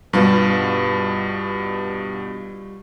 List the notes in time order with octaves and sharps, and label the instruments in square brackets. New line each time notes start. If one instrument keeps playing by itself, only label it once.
[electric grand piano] G2 B2 [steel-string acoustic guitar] G3 F4 B4